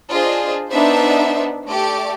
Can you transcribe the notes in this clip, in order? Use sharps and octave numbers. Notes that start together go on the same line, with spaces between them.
D4 F4 G#4 C5 D#5
B3 D4 D#4 C5 E5
A3 G4 D5 D6